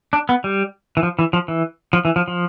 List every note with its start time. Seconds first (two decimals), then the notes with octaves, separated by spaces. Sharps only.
0.13 D4
0.29 B3
0.44 G3
0.97 E3
1.03 F3
1.19 E3
1.33 F3
1.48 E3
1.93 F3
2.05 E3
2.16 F3
2.28 F3